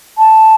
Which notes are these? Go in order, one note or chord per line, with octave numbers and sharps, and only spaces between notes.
A5